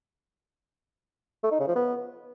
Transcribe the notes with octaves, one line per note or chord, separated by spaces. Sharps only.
A3
D#4
C#3
F3
B3